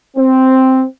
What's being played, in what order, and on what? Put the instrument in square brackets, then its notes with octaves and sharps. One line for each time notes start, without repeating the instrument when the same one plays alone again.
[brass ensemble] C4